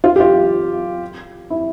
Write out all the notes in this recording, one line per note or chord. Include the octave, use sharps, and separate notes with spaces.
F4
G4
F4
E4